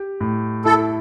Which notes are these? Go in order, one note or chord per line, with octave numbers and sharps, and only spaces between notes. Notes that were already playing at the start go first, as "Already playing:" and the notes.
Already playing: G4
A2
E4 A4